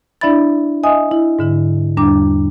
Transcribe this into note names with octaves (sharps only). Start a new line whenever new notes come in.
D4 E4 D5 E5 B5 A6
D#5 E5 G#5 D#6
E4
G#2 D3 E4
E2 G3 D4 A#5 D6